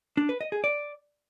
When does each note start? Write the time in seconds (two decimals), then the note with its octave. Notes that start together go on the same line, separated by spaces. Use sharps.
0.17 D4
0.29 B4
0.41 D#5
0.52 G#4
0.64 D5